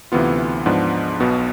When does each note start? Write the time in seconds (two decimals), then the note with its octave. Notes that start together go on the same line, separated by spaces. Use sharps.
0.12 D2 C3 E3 B3 F4
0.66 G#2 F3 B3 D4
1.20 B1 B2 B3